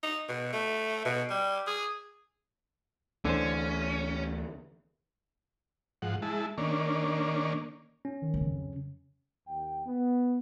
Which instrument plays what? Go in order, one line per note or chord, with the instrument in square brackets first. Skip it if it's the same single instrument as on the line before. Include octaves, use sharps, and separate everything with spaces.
[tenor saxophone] D#4
B2
A3
B2
G3
G#4
[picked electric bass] D2 E3 [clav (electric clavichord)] D3 C5 [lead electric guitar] C#4
[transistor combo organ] G#2 F3 F#5
G#3 E4 A5
D#3 A#3 C#4 D4
[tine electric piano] C#4
[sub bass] D#3
[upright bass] C#3 F#3
[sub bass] F2
[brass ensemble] D#2 G5
B3